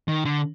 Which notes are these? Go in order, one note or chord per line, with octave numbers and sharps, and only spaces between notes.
D#3
D3